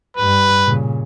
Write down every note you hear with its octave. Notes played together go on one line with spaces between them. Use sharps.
G2 G3 B4
A#2 C#3